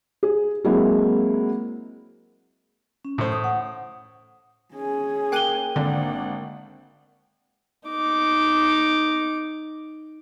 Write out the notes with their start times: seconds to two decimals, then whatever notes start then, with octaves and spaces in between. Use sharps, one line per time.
0.23 G#4
0.64 F#3 G#3 A#3 C4 E4
3.05 C#4
3.18 A2 C5
3.32 D#6
3.44 F#5
4.74 C#4 G#4
5.32 A#3 G5 D6 F#6 D#7 G7
5.76 G#1 D3 A#3 D4 F#5
7.88 D#4 D6